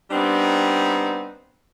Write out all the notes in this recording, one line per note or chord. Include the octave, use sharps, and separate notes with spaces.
G3 B3 C4 D4 D#4